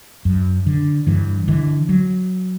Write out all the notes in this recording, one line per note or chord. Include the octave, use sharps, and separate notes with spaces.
F#2
D3
G2 E3
D3 E3
F#3